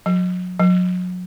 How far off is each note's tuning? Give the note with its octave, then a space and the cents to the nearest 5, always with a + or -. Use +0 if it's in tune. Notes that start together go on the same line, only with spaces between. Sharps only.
F#3 -30
F#3 -30